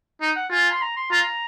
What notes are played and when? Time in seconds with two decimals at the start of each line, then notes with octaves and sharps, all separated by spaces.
0.21 D#4
0.36 F#5
0.51 F4 G#5
0.72 C6
0.82 A#5
0.97 C6
1.11 F4 A#5